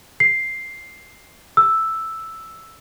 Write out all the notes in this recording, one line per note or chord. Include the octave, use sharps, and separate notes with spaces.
C7
E6